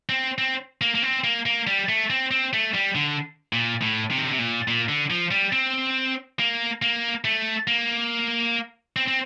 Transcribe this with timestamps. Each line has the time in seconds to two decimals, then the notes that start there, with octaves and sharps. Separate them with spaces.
0.09 C4
0.38 C4
0.81 A#3
0.95 A#3
1.03 C4
1.24 A#3
1.46 A#3
1.67 G3
1.89 A3
2.10 C4
2.31 C4
2.53 A3
2.74 G3
2.95 D3
3.53 A#2
3.82 A2
4.11 C3
4.18 D#3
4.24 D3
4.32 C3
4.39 A#2
4.68 A#2
4.89 D3
5.10 F3
5.31 G3
5.52 C4
6.39 A#3
6.82 A#3
7.25 A3
7.67 A#3
8.96 C4
9.07 C4